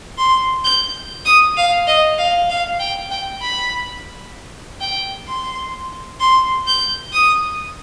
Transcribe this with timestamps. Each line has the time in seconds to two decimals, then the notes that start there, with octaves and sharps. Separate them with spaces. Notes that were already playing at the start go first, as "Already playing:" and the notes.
0.18 C6
0.64 G6
1.25 D#6
1.57 F5
1.87 D#5
2.18 F5
2.50 F5
2.80 G5
3.10 G5
3.42 B5
4.81 G5
5.27 C6
6.20 C6
6.67 G6
7.13 D#6